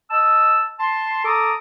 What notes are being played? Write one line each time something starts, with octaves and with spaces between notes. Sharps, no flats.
D#5 A5 E6
A5 C6
A4 A5 A#5 D6 D#6